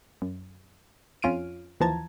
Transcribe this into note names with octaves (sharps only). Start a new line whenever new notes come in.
F#2
F2 C#4 F4 F6 D7 D#7
D#2 E3 F3 A5 A#5 G#6